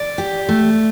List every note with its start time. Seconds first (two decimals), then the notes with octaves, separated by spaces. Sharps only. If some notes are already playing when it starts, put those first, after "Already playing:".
Already playing: D5
0.18 G4
0.49 A3